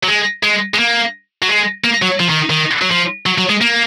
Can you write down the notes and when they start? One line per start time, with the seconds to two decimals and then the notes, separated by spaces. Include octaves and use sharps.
0.03 F#3
0.08 G#3
0.43 G#3
0.74 G#3
0.79 A#3
1.42 F#3
1.49 G#3
1.84 A#3
2.02 F#3
2.20 F3
2.29 D#3
2.50 D#3
2.82 F#3
2.91 F3
3.26 F#3
3.38 F#3
3.49 G#3
3.61 A#3